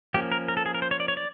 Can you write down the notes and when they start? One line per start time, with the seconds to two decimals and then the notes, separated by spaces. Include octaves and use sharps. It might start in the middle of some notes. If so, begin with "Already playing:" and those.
0.14 F3 A#3 C#4 G4
0.32 A#4
0.48 A#4
0.57 A4
0.66 G#4
0.74 A#4
0.82 C5
0.91 C#5
1.00 D5
1.08 C#5
1.17 D5